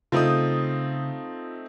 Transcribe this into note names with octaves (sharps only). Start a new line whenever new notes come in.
C#3 A3 C4 D#4 F4 D#6